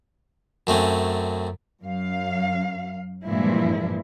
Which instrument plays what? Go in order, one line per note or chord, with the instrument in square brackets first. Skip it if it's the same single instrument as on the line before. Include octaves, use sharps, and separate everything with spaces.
[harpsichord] F#2 A3 C4 C#4
[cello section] F#2 F5
G2 A#2 E3 F3 G#3 E4